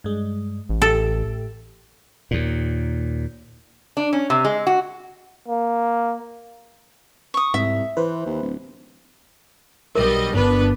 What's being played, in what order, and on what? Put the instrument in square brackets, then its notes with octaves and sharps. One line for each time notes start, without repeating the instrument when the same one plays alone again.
[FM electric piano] G2 G#3
[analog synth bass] A1
[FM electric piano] A2 G4 [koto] A4
[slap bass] D#2 A#2
[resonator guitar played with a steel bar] D4
C#4
C3
G#3
F#4
[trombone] A#3
[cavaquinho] C#6 D#6
[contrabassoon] C2 [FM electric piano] G#2 [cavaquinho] E5
[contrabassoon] E3 [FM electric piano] B4 C5
[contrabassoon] D#2
D1
[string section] B1 G3 D#5 [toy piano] A#4
[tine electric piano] G1 G2 [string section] B3 D4 B4